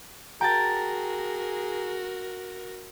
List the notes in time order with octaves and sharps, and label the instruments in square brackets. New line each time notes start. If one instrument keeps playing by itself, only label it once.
[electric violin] F#4 A#4 [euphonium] G#4 [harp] G5 A5 A6 [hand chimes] A#5